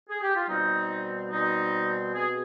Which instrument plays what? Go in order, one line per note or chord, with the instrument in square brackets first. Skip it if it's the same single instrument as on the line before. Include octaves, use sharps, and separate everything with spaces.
[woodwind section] G#4
G4
F4
B2 G3 C4 D#4
B2 G3 C4 D#4
B2 G#3 C4 G#4